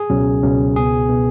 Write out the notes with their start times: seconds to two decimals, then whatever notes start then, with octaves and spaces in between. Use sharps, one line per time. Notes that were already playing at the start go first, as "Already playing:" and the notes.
Already playing: G#4
0.10 C#2 B2 F#3 C#4
0.43 C#2 B2 F#3 C#4
0.75 C#2 B2 B3 G#4
1.09 B2 B3